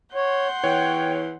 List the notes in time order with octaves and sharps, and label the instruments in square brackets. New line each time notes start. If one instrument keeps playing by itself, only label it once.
[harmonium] C#5 [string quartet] F#5 C6 G6
[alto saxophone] E3 [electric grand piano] C#5 [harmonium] G5